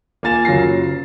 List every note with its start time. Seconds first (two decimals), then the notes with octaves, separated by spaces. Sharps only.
0.23 A#3 F4 G#5 A6 E7
0.45 F#1 F#3 F4 A#6 C7